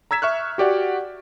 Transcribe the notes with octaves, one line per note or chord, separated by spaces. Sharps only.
A#5 E6 G#6 B6 E7
E5 C#6 F6 F#6
F#4 G4 D5 F#5